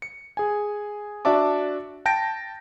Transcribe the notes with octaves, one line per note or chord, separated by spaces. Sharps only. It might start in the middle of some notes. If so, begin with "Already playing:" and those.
C#7
G#4 G#5
D4 F#4 D5 E5 A5 D6
G5 A5 G6 A#6 D7